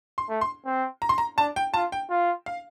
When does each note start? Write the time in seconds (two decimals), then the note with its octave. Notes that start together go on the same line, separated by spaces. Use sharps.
0.18 C6
0.29 A3
0.41 C6
0.66 C4
1.02 A#5
1.09 C6
1.18 A#5
1.38 D4 A5
1.56 G5
1.74 F4 A5
1.92 G5
2.10 F4
2.46 F5